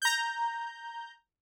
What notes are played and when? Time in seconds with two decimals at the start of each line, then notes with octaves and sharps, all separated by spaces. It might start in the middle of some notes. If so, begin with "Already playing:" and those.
0.02 A#5 G6